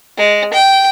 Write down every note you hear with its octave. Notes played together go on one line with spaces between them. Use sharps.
G#3
G5